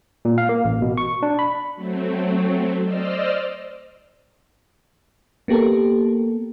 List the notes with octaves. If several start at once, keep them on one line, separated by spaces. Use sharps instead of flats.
A#2
F5
A#3
A1
B2
C#6
D4
B5
F#3 A3 C4
C5 D5 D#5 E6 F6
A#3 B3 G4 A4 A#4